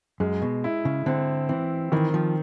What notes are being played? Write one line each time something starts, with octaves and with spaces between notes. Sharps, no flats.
F#2 G#3
B2
E4
C#3
D3 C4
E3 C4
D#3 E3
F3